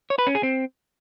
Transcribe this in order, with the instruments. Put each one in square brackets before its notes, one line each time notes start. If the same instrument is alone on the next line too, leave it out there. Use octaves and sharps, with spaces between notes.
[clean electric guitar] C#5
B4
C#4
G#4
C4